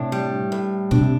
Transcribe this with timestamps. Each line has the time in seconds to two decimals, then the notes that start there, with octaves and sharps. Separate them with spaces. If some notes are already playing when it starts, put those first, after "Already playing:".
Already playing: A2 C3 D4
0.12 G3
0.52 A2
0.91 B2 D4
1.01 C3